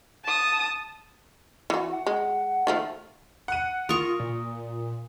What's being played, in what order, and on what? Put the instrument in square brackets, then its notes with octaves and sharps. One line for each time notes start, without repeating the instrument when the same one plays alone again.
[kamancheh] A5 D#6
[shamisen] E3 F#4
[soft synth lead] F#5
[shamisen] G#3
D#3 F3 A3
[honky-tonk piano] F#5 D#7
[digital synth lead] F4 [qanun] A#4 C#6 [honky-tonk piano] D#6
[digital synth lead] A#2